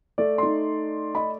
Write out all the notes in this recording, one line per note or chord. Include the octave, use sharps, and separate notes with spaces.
A3 D5
D#4 C6
D#5 B5